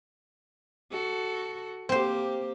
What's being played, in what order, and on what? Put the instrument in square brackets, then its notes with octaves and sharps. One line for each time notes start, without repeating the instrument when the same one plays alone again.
[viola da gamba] F#4 A4
[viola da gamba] A#3 G4 [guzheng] C4 C5